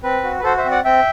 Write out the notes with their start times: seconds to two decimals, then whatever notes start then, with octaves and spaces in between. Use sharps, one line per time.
0.03 C4 B4
0.24 F#4
0.39 B4
0.43 F#4 A4 C5
0.57 C5 E5
0.64 C4
0.71 D5 F#5
0.84 C4 E5 G5